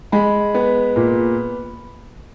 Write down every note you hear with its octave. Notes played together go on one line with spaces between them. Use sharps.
G#3 B5
B3
A#2